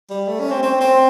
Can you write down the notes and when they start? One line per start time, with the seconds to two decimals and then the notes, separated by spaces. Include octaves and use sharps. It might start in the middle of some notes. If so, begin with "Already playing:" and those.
0.10 G3
0.28 A3
0.39 C#4
0.51 C4
0.63 C4
0.81 C4